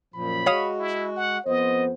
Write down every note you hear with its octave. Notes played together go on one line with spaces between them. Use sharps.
F#2 A#2 F3 B5
G#3 F#4 C#5 F5 D#6
E4
F#5
F2 B3 C5 D#5